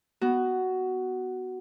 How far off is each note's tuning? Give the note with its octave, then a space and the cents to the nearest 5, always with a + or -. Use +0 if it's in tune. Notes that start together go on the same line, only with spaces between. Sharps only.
B3 +0 F#4 +10